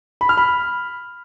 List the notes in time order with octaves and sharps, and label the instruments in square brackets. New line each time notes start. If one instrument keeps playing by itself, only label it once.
[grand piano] B5
F6
B5